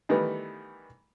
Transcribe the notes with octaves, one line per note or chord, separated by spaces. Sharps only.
D#3 E3 G3 A3 B3